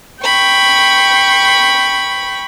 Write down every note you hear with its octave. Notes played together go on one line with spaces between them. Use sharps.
G5 B5 C#6